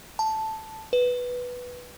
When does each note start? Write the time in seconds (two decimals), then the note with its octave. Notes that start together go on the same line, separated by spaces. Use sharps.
0.19 A5
0.93 B4